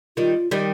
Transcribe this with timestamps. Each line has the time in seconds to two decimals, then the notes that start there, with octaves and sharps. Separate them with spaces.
0.17 D#3 G3 F4
0.51 D#3 G3